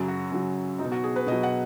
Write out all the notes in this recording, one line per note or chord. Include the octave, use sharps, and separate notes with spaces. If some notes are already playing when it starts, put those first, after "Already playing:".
Already playing: F#2 C#3 F#3
F#4
F#2 C#3 F#3
F#3 D#4
B2
F#4
G#4
B4
B2 F#3 D#5
F#5